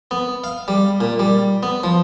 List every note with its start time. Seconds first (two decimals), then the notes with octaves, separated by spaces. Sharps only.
0.11 B3
0.44 F5
0.68 G3
1.01 A#2
1.19 G3
1.63 B3
1.84 F3